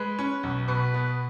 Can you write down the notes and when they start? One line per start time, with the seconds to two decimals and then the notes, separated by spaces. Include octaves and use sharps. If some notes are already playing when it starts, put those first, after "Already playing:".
Already playing: G#3 B4
0.19 C#4
0.43 B1
0.68 B2 B4
0.94 B3